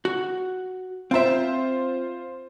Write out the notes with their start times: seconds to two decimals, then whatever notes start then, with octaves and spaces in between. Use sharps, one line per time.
0.05 F#4
1.11 C4 F4 C5 E5